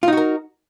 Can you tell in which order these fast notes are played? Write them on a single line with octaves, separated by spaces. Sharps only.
F4 D#4 F#4 A#4